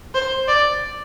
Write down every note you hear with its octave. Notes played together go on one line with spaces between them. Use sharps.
C5
D5